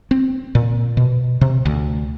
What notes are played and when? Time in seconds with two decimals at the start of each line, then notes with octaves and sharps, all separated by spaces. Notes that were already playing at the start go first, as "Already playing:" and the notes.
0.11 C4
0.55 A#2
0.97 B2
1.41 C3
1.65 D2